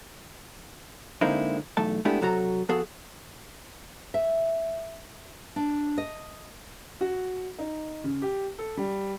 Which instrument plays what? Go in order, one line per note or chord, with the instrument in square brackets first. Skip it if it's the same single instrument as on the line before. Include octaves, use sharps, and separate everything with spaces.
[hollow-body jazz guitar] D3 G#3 A#3 C4 D#4 E4
B1 E2 A3 A5
G#3 A3 B3 D4 E4 G4
C3 F#3 F#4 A4 A#5
F3 B3 F#4 G#4 A4
[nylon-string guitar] E5
D4
D#5
[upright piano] F#4
D#4
C#3
G4
A4
G3